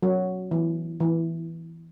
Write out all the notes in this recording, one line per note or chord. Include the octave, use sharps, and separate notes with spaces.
F#3
E3
E3